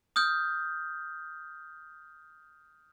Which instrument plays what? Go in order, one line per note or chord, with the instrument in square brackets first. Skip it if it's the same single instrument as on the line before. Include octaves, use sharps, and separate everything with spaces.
[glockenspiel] D#6 F6 G6